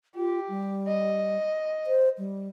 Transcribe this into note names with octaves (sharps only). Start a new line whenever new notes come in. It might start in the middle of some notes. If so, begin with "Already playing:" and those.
F4 G4
G3
D#5
C5
G3